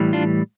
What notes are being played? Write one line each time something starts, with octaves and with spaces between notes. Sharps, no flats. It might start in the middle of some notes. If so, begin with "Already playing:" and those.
Already playing: A2 E3 G3
D4 F4